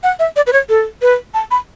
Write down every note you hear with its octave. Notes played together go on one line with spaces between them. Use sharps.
F#5
E5
D5
B4
C#5
A4
B4
A5
B5